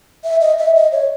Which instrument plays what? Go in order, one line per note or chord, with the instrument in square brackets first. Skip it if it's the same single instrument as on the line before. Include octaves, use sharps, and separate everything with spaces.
[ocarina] E5
D#5
E5
D#5
C#5